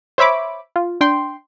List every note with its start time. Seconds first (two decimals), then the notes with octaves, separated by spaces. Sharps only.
0.18 C5 C#5 E5 B5 D6
0.76 F4
1.01 D4 G5 C6